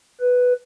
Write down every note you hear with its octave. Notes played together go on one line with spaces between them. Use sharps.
B4